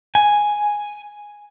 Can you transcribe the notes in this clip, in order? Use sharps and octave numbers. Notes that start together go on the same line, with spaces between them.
G#5